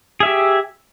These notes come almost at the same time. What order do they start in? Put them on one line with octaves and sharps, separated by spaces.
G#4 E5 G4